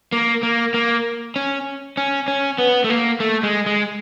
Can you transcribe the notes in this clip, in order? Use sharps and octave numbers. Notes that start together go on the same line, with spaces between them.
A#3
A#3
A#3
C#4
C#4
C#4
B3
A3
A#3
A3
G#3
G#3